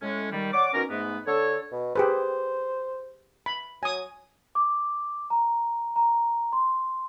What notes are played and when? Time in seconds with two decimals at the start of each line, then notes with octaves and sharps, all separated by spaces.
0.02 A2 G#3 C#4
0.32 D#3 G3
0.52 C#5 D5 F#5 D6
0.73 D#3 B3 C#4 F#4 A#4
0.89 G#2 A3 B3
1.26 D3 A4 C#5
1.72 B2
1.95 G4 G#4 B4 C5
3.46 B5
3.83 F#3 G#5 D#6
4.55 D6
5.30 A#5
5.96 A#5
6.53 C6